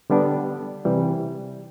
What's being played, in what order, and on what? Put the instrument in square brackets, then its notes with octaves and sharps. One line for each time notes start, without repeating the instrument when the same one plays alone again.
[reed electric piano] D3 G3 B3 D4
C3 E3 G3